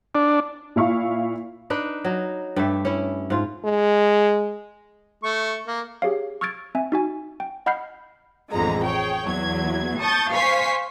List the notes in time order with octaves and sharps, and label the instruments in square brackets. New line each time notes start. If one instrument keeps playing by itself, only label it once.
[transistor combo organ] D4
[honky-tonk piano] A#2 E4 F5 C#6
[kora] D4 D#4 B4
F#3 D#4
G2 A3 G4 E5
C#4 E4
G#2 F4
[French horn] G#3
[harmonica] A3 C#6
A#3
[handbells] G4 G#4 C#5 F5
C#6 E6 F6 G#6 A6 D7
C4 E5 G#5
D#4 F#4 G#5
G5
D#5 F#5 B5 F6 G6 C7
[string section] A1 F2 D3 G#3 A#5
G#4 C#5 G5
E2 F#3 G#6
A5 C#6 D#6 G6 A6
C5 F5 G#5 C#6 B6 C7